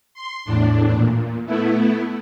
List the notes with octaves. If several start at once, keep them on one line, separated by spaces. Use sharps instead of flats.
C6
E2 A2 D4
A#2
A3 B3 E4